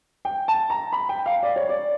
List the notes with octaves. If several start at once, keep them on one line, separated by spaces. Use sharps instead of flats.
G5
A5
A#5
B5
G5
F5
D5
C#5
D5